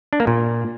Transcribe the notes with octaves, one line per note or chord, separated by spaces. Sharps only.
D4
A#3
A#2